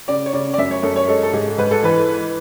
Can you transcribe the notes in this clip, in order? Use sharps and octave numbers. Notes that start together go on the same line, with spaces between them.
C#3 D5
C#5
C#3 D5
D5
F#2 E5
C#5
F#2 A4
C#5
G#3 A4
A4
G#2 G#4
G#2 B4
A4
E3 B4